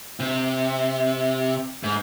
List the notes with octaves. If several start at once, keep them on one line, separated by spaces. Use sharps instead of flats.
C3
G#2